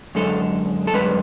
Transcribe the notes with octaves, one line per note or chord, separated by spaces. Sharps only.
F#2 D3 G#3 A4
A4
F#2 D3 G#3 B4